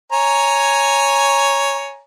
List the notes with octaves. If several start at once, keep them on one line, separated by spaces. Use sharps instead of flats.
C#5 G#5 A#5